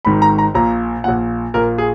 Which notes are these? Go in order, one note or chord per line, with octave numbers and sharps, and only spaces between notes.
G#1 G#2 D#3 B5
A#5
A#5
A#1 A#2 A#5
A#1 A#2 F#5
A#1 A#2 A#4
G#4